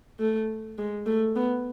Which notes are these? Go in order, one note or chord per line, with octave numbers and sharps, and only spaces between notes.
A3
G#3
A3
B3